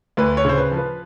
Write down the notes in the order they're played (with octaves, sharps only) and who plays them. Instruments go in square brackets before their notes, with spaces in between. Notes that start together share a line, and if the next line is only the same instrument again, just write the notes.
[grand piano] D2 B4
C#5
C#3 C5
B4
F3
B4